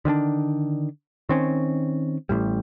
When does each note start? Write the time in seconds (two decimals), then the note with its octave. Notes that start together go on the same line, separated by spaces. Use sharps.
0.05 D3 D#3 C#4 D4
1.29 D#3 C4 C#4
2.29 A1 A2 G3